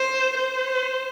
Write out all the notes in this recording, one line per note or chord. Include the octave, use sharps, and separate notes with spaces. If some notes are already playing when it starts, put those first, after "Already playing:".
Already playing: C5
C5